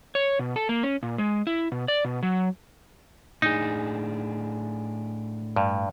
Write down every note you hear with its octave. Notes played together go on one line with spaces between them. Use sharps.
C#5
B2
A4
A#3
C#4
A#2
G#3
E4
B2
D5
B2
F#3
A2 D4 D#4 G#4
G2